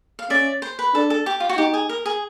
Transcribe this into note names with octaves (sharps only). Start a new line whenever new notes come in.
F5
C#4 D5 E5
C5
B4
D4 A4
A4
G4
F4
F#4
D#4 G4
G#4
A#4
G#4